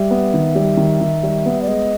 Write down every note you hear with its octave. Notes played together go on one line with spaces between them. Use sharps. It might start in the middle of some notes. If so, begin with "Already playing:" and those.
Already playing: G3 E5
B3
D#3
G3
D#3
D#3
G3
B3
D5
G#3 D#5